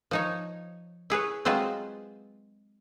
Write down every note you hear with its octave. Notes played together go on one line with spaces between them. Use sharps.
F3 D#4 C#5
E4 G#4 B4 C#5
F#3 G#3 C4 F4 G#4 B4